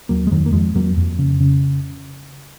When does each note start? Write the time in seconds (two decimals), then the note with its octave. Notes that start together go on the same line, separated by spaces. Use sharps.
0.09 D#2 F#3 A#3
0.27 G#3
0.31 F2 D#3 F#3
0.46 A#3
0.53 F2 F3 G#3
0.75 F2 F#3 A#3
0.97 F2
1.19 C#3
1.40 C#3